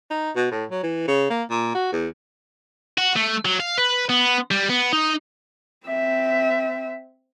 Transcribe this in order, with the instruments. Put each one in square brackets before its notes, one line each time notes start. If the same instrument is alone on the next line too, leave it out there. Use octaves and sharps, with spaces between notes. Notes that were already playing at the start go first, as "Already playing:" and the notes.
[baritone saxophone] D#4
B2
A2
F#3
E3
C#3
A#3
A#2
F#4
E2
[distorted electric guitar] F#4
A3
F#3
F5
B4
B3
G3
B3
D#4
[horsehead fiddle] C4 E5